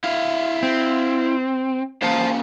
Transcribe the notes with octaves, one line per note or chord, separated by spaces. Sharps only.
E4 F5
C4
A#2 C#3 C5 F5 A5